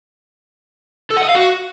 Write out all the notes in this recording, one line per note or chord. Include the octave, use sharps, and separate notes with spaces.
A4
F#5
D#5
F5
F#4